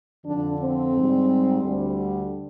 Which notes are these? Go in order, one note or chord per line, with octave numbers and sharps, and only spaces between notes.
F2 D3 F3 D4
C4
G#2 G3
D2 D3 G3